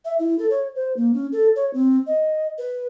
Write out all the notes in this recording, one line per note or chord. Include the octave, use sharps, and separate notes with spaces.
E5
E4
A4
C#5
C5
A#3
C#4
A4
C#5
C4
D#5
B4